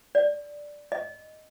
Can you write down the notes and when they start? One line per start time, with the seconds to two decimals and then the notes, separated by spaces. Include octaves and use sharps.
0.15 D5
0.92 D#5